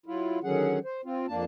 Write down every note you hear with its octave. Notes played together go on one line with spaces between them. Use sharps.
F#3 E4 F4
D3 D#3 F#3 C#4 G#4 F#5
C5
C4 F4
F2 A#3 D4 A5